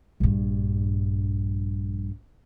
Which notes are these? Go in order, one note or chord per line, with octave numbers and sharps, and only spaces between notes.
A#1 G2